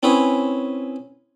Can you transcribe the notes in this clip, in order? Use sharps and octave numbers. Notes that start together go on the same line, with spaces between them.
C4 C#4 E4 G#4 B4 C#5